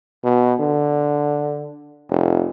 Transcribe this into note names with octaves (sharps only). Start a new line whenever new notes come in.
B2
D3
F1